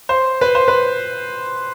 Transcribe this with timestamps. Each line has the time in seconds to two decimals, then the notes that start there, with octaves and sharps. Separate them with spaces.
0.09 C5
0.41 B4
0.55 C5
0.68 B4